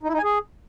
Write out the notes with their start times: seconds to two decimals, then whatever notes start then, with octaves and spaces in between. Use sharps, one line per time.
0.03 D#4
0.08 E4
0.13 D#4
0.18 G#5
0.23 G#4